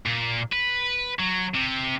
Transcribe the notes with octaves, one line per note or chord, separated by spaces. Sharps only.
A#2
B4
F#3
C3